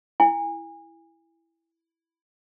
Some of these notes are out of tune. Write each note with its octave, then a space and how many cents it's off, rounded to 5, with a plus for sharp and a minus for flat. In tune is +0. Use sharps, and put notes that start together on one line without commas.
E4 +5 G#5 -30